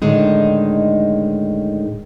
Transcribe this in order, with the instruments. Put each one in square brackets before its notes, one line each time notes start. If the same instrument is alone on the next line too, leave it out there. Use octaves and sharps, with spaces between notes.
[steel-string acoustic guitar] A2 D3 D#3 G#3 D#4